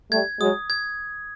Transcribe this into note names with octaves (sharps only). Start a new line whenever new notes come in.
G3 A3 G#6
F#3 G#3 D#6
G#6